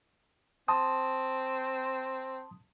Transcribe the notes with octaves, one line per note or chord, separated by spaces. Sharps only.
C4 A5 C6 D#6